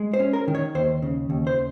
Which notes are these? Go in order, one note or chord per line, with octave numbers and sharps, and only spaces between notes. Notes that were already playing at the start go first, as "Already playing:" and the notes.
Already playing: G#3
C5
C#4
A#4
D#3
C#5
D#2 C5
C#3
D#2
C5